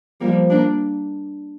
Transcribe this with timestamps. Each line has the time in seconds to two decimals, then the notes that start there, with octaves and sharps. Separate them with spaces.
0.21 F3 G3 A#3
0.50 A#3 D4